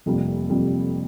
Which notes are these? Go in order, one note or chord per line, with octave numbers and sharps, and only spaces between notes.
F1 F2 C3 G3 A#3
F1 F2 C3 G3 A#3